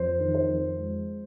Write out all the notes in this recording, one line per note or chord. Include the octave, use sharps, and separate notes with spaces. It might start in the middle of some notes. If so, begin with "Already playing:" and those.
Already playing: F2 C5
D#3
C5
F2
G#3